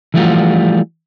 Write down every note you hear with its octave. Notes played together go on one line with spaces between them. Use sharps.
E3 F3 G3 A3 F4 F#4